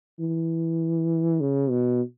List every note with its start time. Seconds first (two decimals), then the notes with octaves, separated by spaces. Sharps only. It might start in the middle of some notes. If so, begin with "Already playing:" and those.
0.20 E3
1.41 C#3
1.70 B2